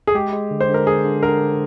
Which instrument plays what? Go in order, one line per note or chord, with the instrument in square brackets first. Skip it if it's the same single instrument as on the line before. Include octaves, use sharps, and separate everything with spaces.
[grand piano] G#4
[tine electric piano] G#3 [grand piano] G4
[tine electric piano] G#3
D3
[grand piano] C5
[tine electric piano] D3
[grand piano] A#4
[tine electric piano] D3 [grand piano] G#4
[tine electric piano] D3
[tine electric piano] D3 [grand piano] A#4
[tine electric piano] D3